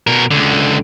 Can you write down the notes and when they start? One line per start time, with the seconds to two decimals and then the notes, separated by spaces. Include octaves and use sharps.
0.07 B2 A#4
0.31 C#2 D3